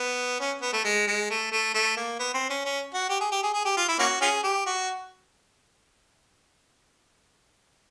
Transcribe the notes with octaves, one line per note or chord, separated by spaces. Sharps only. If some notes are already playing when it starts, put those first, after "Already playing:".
Already playing: B3
C#4
B3
A3
G#3
G#3
A3
A3
A3
A#3
B3
C4
C#4
C#4
F#4
G4
G#4
G4
G#4
G#4
G4
F4
E4
A#3 C#4 F#4
C#4 F4 G#4
G4
F#4